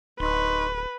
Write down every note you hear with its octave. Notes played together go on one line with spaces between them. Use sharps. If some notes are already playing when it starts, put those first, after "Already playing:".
D1 D#4 B4 C6 C#6